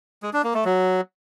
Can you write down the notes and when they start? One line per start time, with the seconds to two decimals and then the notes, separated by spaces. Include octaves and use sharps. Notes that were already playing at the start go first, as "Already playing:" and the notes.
0.23 G#3
0.33 D4
0.44 A#3
0.54 A3
0.65 F#3